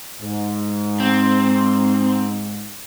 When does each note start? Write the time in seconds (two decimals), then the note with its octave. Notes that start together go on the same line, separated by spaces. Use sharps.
0.21 G#2
1.00 C4